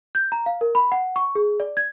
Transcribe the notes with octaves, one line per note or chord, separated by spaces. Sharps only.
G6
A#5
F5
A#4
B5
F#5
C#6
G#4
D5
G#6